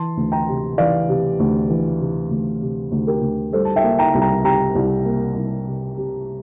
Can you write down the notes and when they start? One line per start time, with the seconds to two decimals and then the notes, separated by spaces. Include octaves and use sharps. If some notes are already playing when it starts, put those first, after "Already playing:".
Already playing: E3 A5 C6
0.17 D2
0.32 G5 A#5
0.48 C3
0.78 E3 D5 F5
1.08 C3
1.39 D2
1.70 E3
2.00 C3
2.31 D2
2.61 C3
2.92 D2
3.07 G4 A#4
3.22 D2
3.53 G3 A4 C5
3.65 A5
3.76 E5 G5
3.83 A#3
3.98 G5 A#5
4.15 C2
4.22 G5 A#5
4.44 C3 G5 A#5
4.75 C2
5.06 A#3
5.36 C2
5.67 C3
5.97 C3